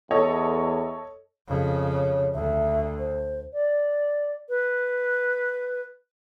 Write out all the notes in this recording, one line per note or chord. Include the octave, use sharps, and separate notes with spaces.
E2 A4 C#5 D#5
F2 C#3
C#5
D2 E5
C5
D5
B4